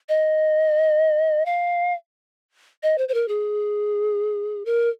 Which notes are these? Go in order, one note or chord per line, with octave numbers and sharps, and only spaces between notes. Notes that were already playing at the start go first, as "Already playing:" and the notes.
D#5
F5
D#5
C5
C5
A#4
G#4
A#4